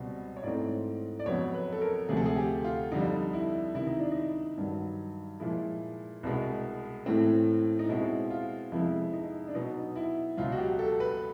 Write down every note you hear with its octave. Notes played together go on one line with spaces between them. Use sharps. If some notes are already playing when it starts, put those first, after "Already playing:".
Already playing: C#2 B2 G3 C4
C#5
G#2 E3 A3 C4 D5
D5
F2 C#3 F#3 B3 C#5
B4
A4
A#4
D2 C3 F3 A3 G#4
A4
G#4
G4
F4
F2 D3 G3 D#4
E4
C#2 C3 D#3 E4
D#4
D4
D#4
G2 D#3 F#3
A#2 F3 G#3 E4
C2 B2 G#3 B3
A2 E3 A3 C4
D#4
B2 G#3 C4 E4
F4
F2 C3 F3 G#3 B3 E4
D#4
D4
B2 F#3 B3 D#4
E4
C#2 B2 F#3 F4
F#4
G4
A4
B4